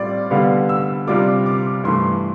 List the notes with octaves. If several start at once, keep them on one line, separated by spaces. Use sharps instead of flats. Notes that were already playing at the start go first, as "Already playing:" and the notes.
Already playing: A2 G3 C4 F4 D5
D3 G3 B3 D4 F5
E6
C3 G3 D4 F4 D6
D6
G2 E3 A3 C6